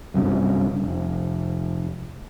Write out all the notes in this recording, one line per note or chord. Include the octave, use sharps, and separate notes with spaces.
F#1 C2 G2 C#4
F1